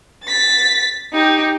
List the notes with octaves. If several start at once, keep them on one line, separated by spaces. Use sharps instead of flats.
A6 B6
D#4 G4